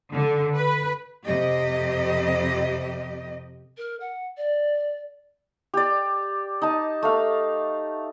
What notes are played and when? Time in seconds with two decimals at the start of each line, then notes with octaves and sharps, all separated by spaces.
0.13 D3
0.55 B4
1.25 F2 C3 G4 D#5
3.77 A#4
4.00 F#5
4.37 D5
5.74 G4 D5
6.61 D#4 A5
7.02 A3 F5